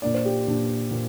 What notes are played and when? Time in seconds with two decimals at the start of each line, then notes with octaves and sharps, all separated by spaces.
0.02 A#2 A#3 D4 D5
0.14 C5
0.25 G4
0.48 A#2 A#3 D4
0.91 A#2 A#3